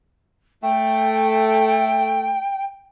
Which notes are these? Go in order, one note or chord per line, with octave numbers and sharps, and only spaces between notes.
A3 G5